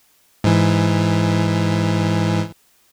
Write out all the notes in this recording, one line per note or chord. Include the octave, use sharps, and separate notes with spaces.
G#2 E3